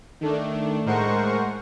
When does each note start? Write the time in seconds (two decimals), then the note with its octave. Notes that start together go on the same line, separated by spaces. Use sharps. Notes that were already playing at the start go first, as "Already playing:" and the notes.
0.21 D#3 A3 D4
0.85 A2 G#3 A#4 C5 F#5 C#6